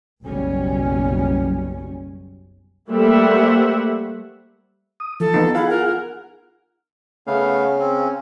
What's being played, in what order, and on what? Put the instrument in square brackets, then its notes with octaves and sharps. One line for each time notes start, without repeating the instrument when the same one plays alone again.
[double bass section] F#1 B1 B2 F#3 G3 C#4
[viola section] G3 A3 A#3 C5 E5 F#5
[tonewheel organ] D#6
[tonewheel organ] E3 F3 [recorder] A4
[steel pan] B3 D#4
[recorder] E4 [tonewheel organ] F4 G#4 F#5 [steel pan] F5
[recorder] A#4
[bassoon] C#3 [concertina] A3 B3 F5
[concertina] C4 C#4